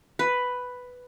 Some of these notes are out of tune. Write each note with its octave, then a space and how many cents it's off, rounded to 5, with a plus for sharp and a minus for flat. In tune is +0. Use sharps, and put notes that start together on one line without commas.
B4 +5